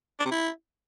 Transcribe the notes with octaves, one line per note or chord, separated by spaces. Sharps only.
D4
C3
E4